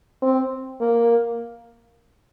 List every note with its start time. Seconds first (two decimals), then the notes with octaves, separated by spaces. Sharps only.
0.22 C4
0.81 A#3